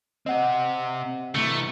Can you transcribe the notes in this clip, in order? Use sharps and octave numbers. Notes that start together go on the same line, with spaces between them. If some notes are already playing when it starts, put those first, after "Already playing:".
C4 G4 D#5 F#5
C3 E3 A3